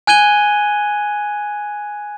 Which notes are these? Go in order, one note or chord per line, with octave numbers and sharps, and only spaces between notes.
G#5 F#6 G#6 D#7 G7